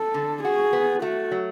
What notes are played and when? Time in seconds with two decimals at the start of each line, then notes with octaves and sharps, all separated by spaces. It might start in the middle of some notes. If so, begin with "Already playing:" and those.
Already playing: A4
0.14 D3
0.44 F#4 G#4
0.73 B3
1.02 A3 F#4
1.31 F#3